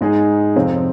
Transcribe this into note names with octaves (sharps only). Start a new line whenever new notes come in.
G#2 G#3 D#4 G#4
F2 C3 F3 C4